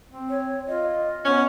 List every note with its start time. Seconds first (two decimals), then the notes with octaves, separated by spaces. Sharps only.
0.11 C4
0.29 C#5
0.67 F4 D#5
1.25 B3 C#4